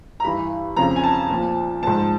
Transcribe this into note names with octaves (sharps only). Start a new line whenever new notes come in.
A#5
G2 E3 B5
F2 C#3 F3 A#5
G#5
A5
A#2 F3
G#2 F3 A5